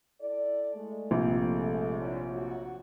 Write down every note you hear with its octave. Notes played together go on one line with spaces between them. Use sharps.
E4 A4 D5
G#3 A3
A#1 C3
D3 C#4 E4
F#3 F#4